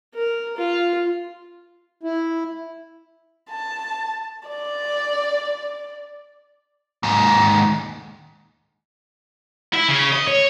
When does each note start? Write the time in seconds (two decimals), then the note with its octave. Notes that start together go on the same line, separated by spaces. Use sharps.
0.15 A#4
0.57 F4
2.03 E4
3.50 A5
4.48 D5
7.03 D#2 G#2
9.74 E4
9.88 C#3
10.13 D#5
10.27 C#5